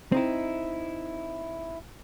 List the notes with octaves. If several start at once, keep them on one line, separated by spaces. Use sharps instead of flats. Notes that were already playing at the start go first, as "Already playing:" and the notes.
C4 D#4 E4